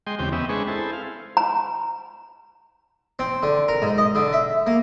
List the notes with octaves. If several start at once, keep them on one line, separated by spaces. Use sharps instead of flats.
G#3 D#5 G5 C6
E2 C#3 C4 G4 G5
B3 C#4 D#5 E5
G#3 C4 D4 G#4 B4 C#6
E4 G#4 A4 C5
F5
A#5
C4
D3
A#4
G#2
D#5
D3
E5
A#3